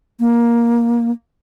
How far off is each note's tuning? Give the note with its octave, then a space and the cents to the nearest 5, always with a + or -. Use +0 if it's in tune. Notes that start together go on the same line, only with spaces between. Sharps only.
A#3 +15